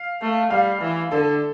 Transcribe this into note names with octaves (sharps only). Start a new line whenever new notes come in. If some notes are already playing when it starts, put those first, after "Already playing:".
Already playing: F5
A3
G3 F5
E3
D3 A4